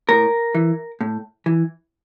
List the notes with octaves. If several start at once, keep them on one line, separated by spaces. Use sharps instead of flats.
A2 A#4
E3
A2
E3